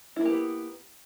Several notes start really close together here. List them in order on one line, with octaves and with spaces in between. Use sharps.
E4 A#3 G4 B3